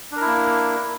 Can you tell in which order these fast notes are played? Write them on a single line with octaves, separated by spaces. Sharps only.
D4 A#4 E4 A#3